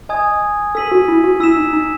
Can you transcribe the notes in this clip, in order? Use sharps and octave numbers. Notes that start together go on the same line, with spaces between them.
D#5 G#5 D#6 G#6
A4 E6 B6 D#7 F#7
F#4
E4
F#4
E4 E6 B6 E7
D#4
D#4